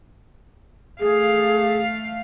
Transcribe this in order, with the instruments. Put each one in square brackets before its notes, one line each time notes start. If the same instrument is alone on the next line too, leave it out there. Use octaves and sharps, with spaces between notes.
[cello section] A3 F5 [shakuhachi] G#4